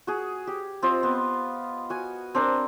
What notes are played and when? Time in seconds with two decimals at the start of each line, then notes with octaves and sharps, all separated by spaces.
0.07 F#4 G#4
0.47 G4
0.82 C4 F4 D#5
1.03 B3
1.90 F#4 G#5
2.35 C4 D4 A#4